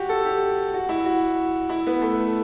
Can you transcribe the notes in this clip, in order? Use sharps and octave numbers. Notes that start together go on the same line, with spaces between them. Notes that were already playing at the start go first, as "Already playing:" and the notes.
Already playing: F#4 G4
A4
G4
F#4
E4
F#4
E4
B3
A3